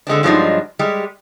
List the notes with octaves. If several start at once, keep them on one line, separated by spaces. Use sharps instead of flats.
D3 G#3 C4 D4
G2 F3 F#3 G#3 D4 D#4
G3 G#3 G4